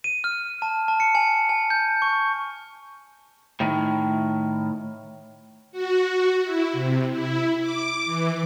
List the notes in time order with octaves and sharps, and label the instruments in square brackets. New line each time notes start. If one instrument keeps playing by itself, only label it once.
[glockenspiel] D#7
F6
A5
A5
C#7
G#5
G#5
G6
C#6
[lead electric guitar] A2 D#3
[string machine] F#4
E4
C3
E4
D6
E3